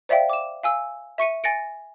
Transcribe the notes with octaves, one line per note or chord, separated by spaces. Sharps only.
C5 D5 E5 F5 G5
D6 E7
F5 G#5 E6
E5 C#6 C#7 D#7
G#5 A6 A#6 C#7 D7